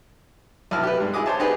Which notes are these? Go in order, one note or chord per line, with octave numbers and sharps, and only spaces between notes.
B1 E4 A5 F6
G4 B4
G#2 G3
E4 G#4 D#5 D6 D#6
C5 C#5 A5
D4 D#4 G4 G#4 B4